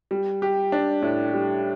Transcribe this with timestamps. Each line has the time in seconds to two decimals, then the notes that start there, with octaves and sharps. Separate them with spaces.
0.11 G3
0.42 G4
0.72 D4
1.02 A2
1.34 G3